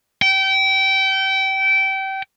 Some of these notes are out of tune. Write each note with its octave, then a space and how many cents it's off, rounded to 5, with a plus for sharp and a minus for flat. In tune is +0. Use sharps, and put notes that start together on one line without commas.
G5 -25